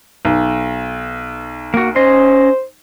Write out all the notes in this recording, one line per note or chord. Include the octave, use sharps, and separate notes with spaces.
B1
A#3 F#4
C#4 C5 D#5 C6